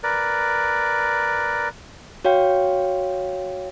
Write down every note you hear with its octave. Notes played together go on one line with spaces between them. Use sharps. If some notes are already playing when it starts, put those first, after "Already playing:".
A#4 B4 D5
F#4 C#5 F5 G5